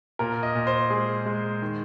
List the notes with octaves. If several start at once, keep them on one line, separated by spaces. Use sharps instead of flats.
A#2 A#4
D#5
A#2
C5
G#3 G#4
G#3
D#3